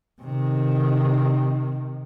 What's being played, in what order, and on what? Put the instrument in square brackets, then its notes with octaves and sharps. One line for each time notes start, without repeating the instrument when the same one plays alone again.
[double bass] C3 D#3